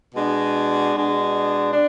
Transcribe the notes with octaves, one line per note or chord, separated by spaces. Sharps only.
B2 G#3 D4
B2 G#3 D4
D4